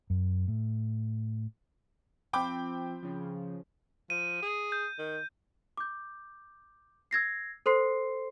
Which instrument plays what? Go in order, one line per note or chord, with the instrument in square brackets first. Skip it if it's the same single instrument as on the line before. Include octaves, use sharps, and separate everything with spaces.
[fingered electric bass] F#2
A2
[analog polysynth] F3 C4 [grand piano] G5 B5 D6
[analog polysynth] C#3 F3
[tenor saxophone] F3 [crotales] D#7
[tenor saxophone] G#4
[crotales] G6
[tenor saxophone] D#3
[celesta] D6 G6
E6 G#6 A#6 C7
A4 C5 C6 C7